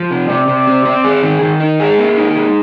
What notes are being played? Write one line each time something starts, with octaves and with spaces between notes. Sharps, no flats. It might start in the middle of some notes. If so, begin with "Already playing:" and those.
Already playing: F3
C3
C3 D5
C3
C4
C4
G#4
D#3
D#3
D#4
G#4
A#3
D#4
G#4